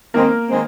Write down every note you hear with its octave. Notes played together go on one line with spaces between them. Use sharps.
D#3 G#3 A#3 C4 A#4
D#3 G#3 C4